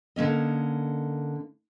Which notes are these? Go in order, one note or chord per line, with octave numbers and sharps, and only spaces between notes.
D3 A#3 C#4 D#5